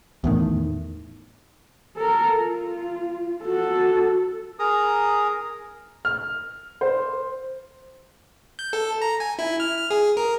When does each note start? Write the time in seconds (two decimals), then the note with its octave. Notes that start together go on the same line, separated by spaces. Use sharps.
0.24 E2 A2 D#3
1.96 A4 A#4
2.37 F4
3.44 F#4 A4
4.59 G#4 A#4 A#5 D#6
6.05 F6
6.81 C5
8.59 G6
8.73 A4
9.02 A#5
9.20 G#5
9.39 E4
9.60 F6
9.77 F6
9.90 G#4
10.17 A#4